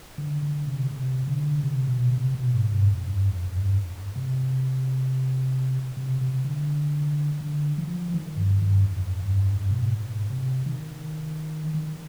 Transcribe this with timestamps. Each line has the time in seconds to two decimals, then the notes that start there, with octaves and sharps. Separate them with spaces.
0.18 D3
0.43 D3
0.67 C3
0.91 C3
1.28 D3
1.63 C3
1.87 B2
2.12 C3
2.35 B2
2.54 G#2
2.71 G2
2.90 F2
3.07 G2
3.31 F2
3.56 G2
4.16 C3
5.97 C3
6.21 C3
6.44 D3
7.41 D3
7.78 F3
8.14 D#3
8.37 G2
8.62 G2
8.86 F2
9.22 G2
9.57 G2
9.71 B2
9.82 G#2
10.30 C3
10.66 D#3
11.74 D#3